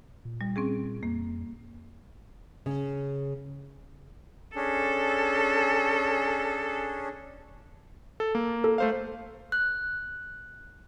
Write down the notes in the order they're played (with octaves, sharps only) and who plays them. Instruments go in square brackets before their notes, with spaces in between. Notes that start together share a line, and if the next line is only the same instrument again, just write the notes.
[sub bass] A#2
[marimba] G3
C4 C#4 G#4
[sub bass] F2 [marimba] A#3
[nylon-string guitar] C#3
[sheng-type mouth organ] C#4 D4 G#4 [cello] A4
[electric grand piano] A4
A#3
[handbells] A4
[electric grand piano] A3 C5 F5
[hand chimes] F#6